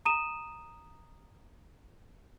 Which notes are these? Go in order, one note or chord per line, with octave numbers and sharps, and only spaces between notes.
A#5 D#6 D#7 E7